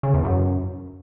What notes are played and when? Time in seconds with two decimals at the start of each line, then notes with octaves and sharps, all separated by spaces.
0.03 C#3
0.14 E2
0.24 F#2